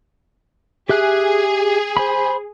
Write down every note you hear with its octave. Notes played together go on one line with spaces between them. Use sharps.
G4 G#4 E5 F#6
C5 G#5 B5